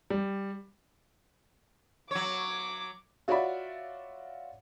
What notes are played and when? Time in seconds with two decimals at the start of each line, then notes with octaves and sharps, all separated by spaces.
0.10 G3
2.11 F#3 C#5 D6
3.28 F4 F#4 C#5 D5 E5 B5